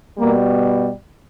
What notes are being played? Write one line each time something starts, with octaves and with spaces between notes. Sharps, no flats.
B2 G3 A#3